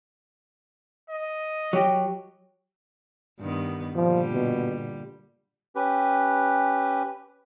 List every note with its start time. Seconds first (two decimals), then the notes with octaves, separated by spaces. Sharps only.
1.10 D#5
1.73 F#3 G4
3.39 G2 D#3 B3
3.96 A#2 D3 F3 G3
4.34 B2
5.76 C#4 G4 B4